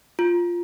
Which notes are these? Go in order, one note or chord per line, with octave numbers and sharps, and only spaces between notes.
F4